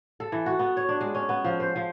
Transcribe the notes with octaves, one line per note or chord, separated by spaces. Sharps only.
A4
E3
F#4
B3
C#5
D4
G#3
C#4
B3
F3
C5
F3